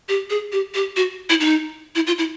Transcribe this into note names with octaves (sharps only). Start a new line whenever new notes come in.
G4
G#4
G4
G4
F#4
E4
D#4
E4
F4
E4